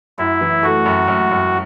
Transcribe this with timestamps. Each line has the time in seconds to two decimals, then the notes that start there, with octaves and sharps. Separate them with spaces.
0.18 F#2 E4
0.41 E3
0.63 A3 F#4
0.86 F#2
1.08 F#2
1.31 F#2